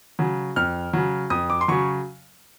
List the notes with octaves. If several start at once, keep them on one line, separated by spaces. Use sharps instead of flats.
C#3 F#3
F2 F6
C#3 F#3
F2 D#6
D6
C6
C#3 F#3 C#6